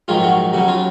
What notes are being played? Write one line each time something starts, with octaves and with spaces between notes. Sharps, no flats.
A#1 G#2 D#3 F#3 F4
F#4
D#2 C#3 F#3 F#4
F4